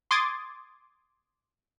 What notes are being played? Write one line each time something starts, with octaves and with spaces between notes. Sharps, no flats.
C6 D6 D#6 G#6 A6